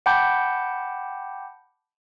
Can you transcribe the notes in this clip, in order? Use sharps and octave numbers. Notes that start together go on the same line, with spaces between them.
F#5 G5 A5 B5 D6 G6